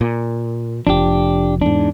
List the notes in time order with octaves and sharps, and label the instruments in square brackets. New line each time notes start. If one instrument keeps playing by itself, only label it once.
[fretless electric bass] A#2
[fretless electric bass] F1 A#1 F3 [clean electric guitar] D4 G4
[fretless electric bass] E2 G#2 [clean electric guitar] D4